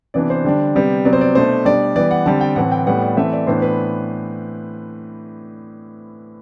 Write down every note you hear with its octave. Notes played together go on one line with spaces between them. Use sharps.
C3 E3 B3 D4 D5
C5
D3 G3 D4
C3 G3 B3
C3 F#3 B3 D5
C5
D5
B2 A3 D4 C5
B2 G3 D4 D5
E3 G3 B3 D5
F#5
D3 G3 C4 A5
G5
A2 E3 A3 C4 F#5
G5
A2 G3 B3 F#5
D5
E3 A3 C4 E5
D5
A2 E3 B3 D4 C5
B4